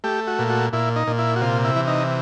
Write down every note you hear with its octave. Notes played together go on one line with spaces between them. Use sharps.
A3 G4
F#4
A#2
F#4
A#2 E4
D#4
A#2
E4
F#4
C3 F4
E4
E3
D#4